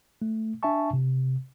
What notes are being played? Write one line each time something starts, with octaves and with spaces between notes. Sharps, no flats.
A3
D4 E5 G#5 A5 C#6
C3